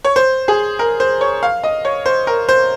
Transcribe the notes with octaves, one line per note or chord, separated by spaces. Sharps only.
C#5
C5
G#4
A#4
C5
C#5
F5
D#5
C#5
C5
A#4
C5